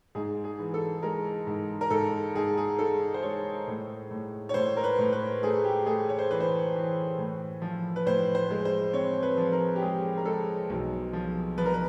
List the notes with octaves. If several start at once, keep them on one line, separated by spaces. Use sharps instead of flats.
G#2 G#4
G#4
E3
A4
G#3 A#4
G#2
A#4
G#2 A4
G#2 G#4
G#4
G#3 A4
C5
G#3 C#5
A2
A2
C#5
A2 C5
A#4
B4
A2
B4
A3 G#4
G4
A3 G#4
C#5
C5
E3 B4
C5
E3
A2
F3
B4
A2 C5
C5
G#3
C5
C4 C#5
B4
F3
A#4
G4
G#3 G#4
A#4
G#3 A4
B1
F3
F3 B4
A#4
B4